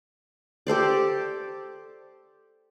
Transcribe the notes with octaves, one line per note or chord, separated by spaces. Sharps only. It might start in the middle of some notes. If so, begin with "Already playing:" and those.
G4 A4 C5 D5